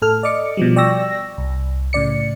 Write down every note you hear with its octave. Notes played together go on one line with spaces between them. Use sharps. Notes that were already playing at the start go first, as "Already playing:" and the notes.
A2 A4 F6
D5 D#5 D6 C#7
B2 F3 G3
D5 G5 C#6 E6 A#6
C2
A2 C#3 D5 C#7